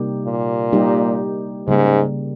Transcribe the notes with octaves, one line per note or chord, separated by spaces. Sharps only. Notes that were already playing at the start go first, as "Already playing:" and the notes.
Already playing: C3 G3 A#3 D#4 G4
A#2
G3 A#3 D#4 G4
G#2 C#3 G3 A#3